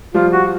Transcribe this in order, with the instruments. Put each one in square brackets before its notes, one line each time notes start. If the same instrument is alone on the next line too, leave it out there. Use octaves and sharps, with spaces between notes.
[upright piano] F3 G3 [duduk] F4
[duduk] F#4